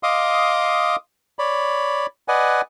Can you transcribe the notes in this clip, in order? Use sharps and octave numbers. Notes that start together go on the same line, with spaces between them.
D#5 F5 C6 D6 D#6
C#5 D5 B5
B4 D5 D#5 F#5 G#5